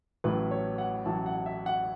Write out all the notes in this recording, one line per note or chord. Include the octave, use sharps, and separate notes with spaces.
A1 A2 F#3 B4
C#5
F#5
A1 A2 F#3 A5
F#5
E5
F#5